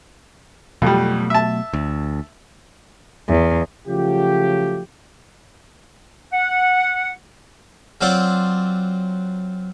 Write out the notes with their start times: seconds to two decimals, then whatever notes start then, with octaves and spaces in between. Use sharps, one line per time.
0.82 F2 B2 F#3 G3 A3
1.30 E5 A5
1.73 D2
3.28 E2
3.87 C#3 F3 F#3 A3 F4 G4
6.32 F#5
8.01 F#3 C4 F4 D5 F#5